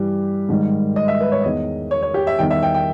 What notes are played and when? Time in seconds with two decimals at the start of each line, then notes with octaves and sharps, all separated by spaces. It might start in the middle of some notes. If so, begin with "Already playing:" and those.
Already playing: G2 E3 G3 G4
0.49 G#2 D#3 G3
0.96 D#5
1.08 E5
1.21 B4
1.32 C#5
1.43 E2 D#3 G#3 D#5
1.91 C#5
2.03 C#5
2.14 G4
2.27 E5
2.38 E2 D#3 G3 G5
2.50 E5
2.63 G5
2.75 G5